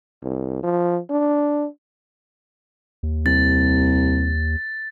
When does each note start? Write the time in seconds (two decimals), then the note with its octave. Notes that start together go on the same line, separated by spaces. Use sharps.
0.23 C2
0.63 F3
1.10 D4
3.03 D#2
3.26 C2 A6